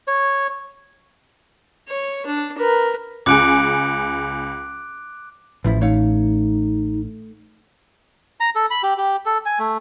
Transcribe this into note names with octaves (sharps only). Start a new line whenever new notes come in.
C#5
C#5
D4
A#4 B4
C#2 G#4 D6 F#6 D7
A1 E3 F3 E4
A3 D#4 C#5 F5
A#5
A4
B5
G4
G4
A4
G#5
A3